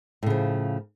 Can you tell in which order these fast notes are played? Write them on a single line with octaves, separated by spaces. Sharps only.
A2 C#3 F3